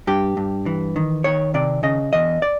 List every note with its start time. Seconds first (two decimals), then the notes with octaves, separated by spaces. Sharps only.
0.07 G2 G4
0.37 G2
0.66 E3
0.96 D#3
1.24 D#3 C#5
1.54 C3 D5
1.83 C#3 D#5
2.13 E2 D#5
2.42 D5